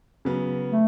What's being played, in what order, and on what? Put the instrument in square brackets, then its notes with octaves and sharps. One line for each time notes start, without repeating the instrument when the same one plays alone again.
[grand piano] C#3 F#3 B3
[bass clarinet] A3